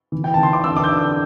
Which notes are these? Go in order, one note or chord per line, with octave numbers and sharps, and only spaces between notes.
E3
G5
E3 A5
C6
D6
D3 E6
D6
G6
D3 E6